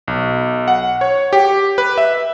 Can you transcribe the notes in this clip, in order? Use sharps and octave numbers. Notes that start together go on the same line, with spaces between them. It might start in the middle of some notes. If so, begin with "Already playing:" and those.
B1
F#5
C#5
G4
B4
E5